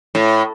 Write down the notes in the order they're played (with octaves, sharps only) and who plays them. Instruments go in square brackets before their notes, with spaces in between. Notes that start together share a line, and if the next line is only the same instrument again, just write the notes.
[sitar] A2